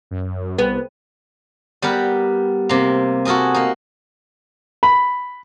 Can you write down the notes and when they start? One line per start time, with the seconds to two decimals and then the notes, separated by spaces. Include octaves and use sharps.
0.11 F#2
0.59 C2 B3
1.82 G3 B3 A#4 B4
2.69 C3 A#3
3.25 F#4 A4 A#4 D#5 G#5
3.54 A#3 D#4
4.83 B5